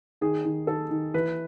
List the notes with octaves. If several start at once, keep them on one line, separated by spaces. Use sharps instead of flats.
D#3 G#4
D#3
D#3 A4
D#3
E3 B4